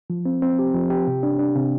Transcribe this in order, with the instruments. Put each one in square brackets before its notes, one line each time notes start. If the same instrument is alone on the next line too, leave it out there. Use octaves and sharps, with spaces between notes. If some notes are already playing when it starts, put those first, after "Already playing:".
[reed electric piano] F3
C4
C4
G4
F3
G4
C3
D4
D4
C3